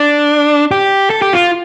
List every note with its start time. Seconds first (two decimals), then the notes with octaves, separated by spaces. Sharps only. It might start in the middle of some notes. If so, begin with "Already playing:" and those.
Already playing: D4
0.71 G4
1.10 A4
1.22 G4
1.33 F4